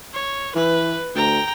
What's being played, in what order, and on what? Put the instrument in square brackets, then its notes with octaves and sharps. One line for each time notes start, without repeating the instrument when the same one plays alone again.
[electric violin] C#5
[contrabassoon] E3 [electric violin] B4
[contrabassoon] D2 [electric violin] G5 A#5